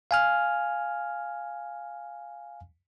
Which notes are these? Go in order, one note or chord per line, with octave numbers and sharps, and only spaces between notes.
F5 G#5 F6